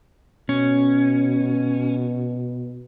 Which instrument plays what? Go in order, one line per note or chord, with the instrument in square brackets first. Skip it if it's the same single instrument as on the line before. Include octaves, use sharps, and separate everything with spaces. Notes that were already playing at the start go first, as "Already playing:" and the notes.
[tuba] B2 [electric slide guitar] C#4